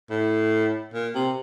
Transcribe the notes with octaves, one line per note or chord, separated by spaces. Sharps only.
A2
A#2
C3